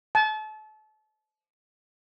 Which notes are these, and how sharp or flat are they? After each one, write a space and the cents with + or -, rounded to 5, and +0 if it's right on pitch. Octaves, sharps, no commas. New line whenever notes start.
A5 -35